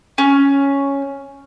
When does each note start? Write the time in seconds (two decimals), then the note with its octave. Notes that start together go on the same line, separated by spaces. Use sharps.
0.18 C#4